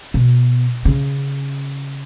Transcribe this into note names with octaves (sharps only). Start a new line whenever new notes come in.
B2
C#3